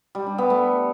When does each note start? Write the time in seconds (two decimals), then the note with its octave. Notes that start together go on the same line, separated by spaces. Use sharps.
0.15 G3
0.27 D4
0.38 B3
0.50 A3